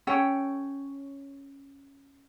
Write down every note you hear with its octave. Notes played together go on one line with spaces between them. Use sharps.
C#4 A4 C#5 G5